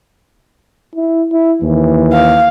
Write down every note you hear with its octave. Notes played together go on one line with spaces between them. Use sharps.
E4
E4
D#2 E3
F5